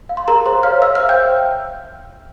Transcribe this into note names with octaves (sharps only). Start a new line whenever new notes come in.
F5
C6
G#4 A#4 A#5
G#4 C5 C6
C#5 F5 F6
C5 E5 E6
C5 F5 F6
G5 G6
E5